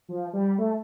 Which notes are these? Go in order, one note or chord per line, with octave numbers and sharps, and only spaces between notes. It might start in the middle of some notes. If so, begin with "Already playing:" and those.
F3
G3
A3